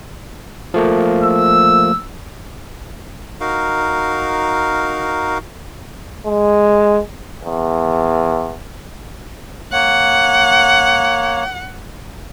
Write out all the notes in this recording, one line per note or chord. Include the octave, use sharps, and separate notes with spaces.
F3 A3 A#3
E6
D#4 F#4 A#4 F5
G#3
E2
A#3 C#5 F#5